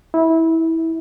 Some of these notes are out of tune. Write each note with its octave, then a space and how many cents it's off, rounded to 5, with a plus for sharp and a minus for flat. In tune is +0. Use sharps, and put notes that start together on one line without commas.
E4 -20